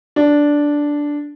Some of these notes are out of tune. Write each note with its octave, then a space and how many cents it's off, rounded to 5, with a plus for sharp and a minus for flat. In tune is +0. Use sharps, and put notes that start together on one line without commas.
D4 -5